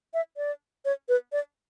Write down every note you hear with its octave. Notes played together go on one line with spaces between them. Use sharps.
E5
D5
C#5
B4
D5